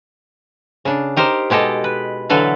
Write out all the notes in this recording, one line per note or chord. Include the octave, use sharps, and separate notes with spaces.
C#3 D4
D#4 G4 A#4 C5
B2 G#3 G4 A4 D#5
B4
D3 E3 F#3 A4 B4 F5